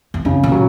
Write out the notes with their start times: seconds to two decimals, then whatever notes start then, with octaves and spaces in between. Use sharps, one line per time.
0.14 E2
0.25 F#2 C#3
0.43 A#2
0.52 F#3